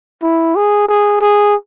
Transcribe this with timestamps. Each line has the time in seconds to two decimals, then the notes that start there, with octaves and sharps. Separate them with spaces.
0.22 E4
0.56 G#4
0.88 G#4
1.21 G#4